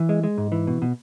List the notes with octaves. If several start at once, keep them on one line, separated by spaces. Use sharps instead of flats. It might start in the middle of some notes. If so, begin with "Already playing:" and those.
Already playing: E3
G#3
G#3
G#2
E3
B2
B2